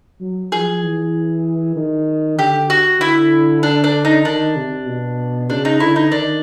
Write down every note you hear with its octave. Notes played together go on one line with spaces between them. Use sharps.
F#3
F3 G#4
E3
D#3
D3 G4
F#4
D3 E4
D4
D4
D#4
D#3 D4
C3
B2
C#3 D4
D#4
D3 E4
D#4
D#3 D4